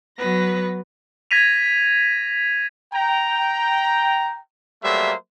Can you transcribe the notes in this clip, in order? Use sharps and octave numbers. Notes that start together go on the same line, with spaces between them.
F#3 B3 B4 A#6
G#6 A#6 B6 D#7 F7
G5 A#5
F#3 G3 A3 A#3 C5 E5